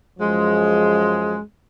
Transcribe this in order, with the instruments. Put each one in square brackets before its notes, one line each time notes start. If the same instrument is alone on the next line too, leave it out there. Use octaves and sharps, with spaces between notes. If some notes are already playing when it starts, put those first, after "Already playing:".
[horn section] F#2 F3 G#3